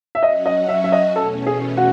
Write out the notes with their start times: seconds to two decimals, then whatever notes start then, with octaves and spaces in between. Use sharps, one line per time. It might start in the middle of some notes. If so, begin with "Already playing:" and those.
0.15 E5
0.23 F#3 C#4 F#4 D#5
0.46 D#5
0.68 E5
0.84 E5
0.92 D#5
1.15 E2 B2 A3 C#4 A4
1.47 G#4
1.77 F#4